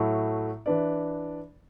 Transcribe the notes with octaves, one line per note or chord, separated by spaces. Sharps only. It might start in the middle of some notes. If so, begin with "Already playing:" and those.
Already playing: A2 F#3 A3 E4
E3 D4 B4 D5